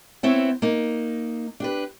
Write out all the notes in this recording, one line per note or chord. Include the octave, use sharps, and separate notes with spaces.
B3 C4 E4 C#5
A#3 D#4
D4 G4 B4